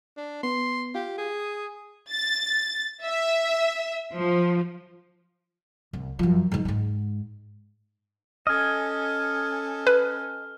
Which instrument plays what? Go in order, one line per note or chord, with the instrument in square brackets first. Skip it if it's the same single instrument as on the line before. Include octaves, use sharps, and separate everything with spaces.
[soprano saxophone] D4
[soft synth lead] B3 [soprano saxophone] C6
[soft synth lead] F4 [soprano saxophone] G4
[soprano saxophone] G#4
[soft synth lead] D#6
[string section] A6
E5
F3
[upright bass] C2
F#2 F3
D#3 G#3
G#2 G#3
[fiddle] C#4 A4 [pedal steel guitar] D#5 G#5 [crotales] F6
[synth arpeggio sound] B4